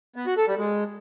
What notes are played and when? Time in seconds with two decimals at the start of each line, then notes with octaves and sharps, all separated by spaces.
0.16 B3
0.27 F#4
0.37 A4
0.48 G3
0.58 G#3